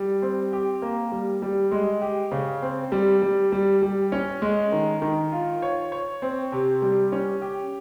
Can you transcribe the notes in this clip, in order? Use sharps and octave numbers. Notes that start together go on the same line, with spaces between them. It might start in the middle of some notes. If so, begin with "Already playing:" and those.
Already playing: G3
C4
G4
A#3
G3
G3
G#3
G4
C#3
C4
G3
G3
G3
G3
C#4
G#3
D#3
D#3
F4
C#5
C#5
C4
C3
G3
C#4
G4